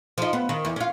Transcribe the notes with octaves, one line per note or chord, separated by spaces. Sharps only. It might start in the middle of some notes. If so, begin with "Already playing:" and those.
F3 D#4
B3
D#3
E2
C#4 F4